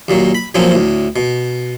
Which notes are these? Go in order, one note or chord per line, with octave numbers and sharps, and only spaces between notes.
D#2 A#2 F#3
B5
A#2 F3 F#3 C4 C#4
D2 A2
B2